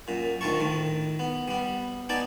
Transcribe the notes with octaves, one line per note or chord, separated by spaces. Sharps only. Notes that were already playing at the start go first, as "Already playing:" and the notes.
F#2 A#2
D2 D#3 F4 A#4 A5 C#6
A2 D#3
B3
G3 B3
B3 D#4 D5 G#5 A5